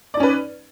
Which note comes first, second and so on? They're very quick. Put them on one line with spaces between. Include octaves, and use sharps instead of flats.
D5 D#4 C#4 B4